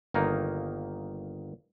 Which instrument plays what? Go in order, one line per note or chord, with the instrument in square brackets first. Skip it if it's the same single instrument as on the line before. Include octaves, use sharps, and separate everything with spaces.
[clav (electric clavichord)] G1 D#3 A#3 D#4